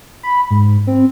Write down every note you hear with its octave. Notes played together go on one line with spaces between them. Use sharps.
B5
G#2
C4